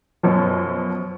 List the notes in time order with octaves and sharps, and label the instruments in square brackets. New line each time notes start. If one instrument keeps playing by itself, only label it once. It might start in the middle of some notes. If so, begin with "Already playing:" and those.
[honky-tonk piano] F#2 B2 F3